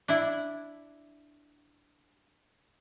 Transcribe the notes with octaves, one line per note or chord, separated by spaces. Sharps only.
D4 E4